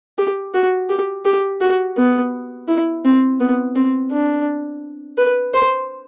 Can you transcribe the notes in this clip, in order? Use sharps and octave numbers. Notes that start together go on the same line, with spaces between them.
G4
F#4
G4
G4
F#4
B3
E4
C4
B3
C4
D4
B4
C5